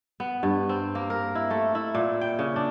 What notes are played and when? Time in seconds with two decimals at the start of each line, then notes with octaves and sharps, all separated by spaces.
0.20 B3
0.43 G2
0.69 C4
0.95 A#3
1.10 A#4
1.35 E4
1.50 A3
1.75 E4
1.95 A#2
2.21 G5
2.39 C#3
2.56 D4